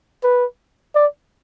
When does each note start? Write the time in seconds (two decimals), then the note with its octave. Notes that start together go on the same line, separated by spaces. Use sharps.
0.24 B4
0.95 D5